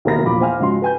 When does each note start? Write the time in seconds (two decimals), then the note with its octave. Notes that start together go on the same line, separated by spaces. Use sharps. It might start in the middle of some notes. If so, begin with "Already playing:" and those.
0.05 D#2 B2 E4 A#4 B5 A#6
0.24 A#1 E2 A#2 B5 D6
0.40 C5 F5 G#5 F6
0.59 G#2 C#3 F3 F#4 C6
0.82 B4 G#5 G6